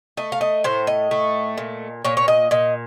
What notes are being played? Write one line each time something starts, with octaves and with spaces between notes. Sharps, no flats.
A3 D#5
F5
D#5
A2 C5
D#5
A3
A#2
A#2 C#5
C#5
D#5
A#2 D#5